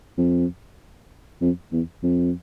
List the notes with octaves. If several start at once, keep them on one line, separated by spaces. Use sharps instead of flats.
F2
F2
E2
F2